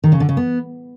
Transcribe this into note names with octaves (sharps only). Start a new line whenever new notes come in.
D#3
C#3
D3
C#3
B3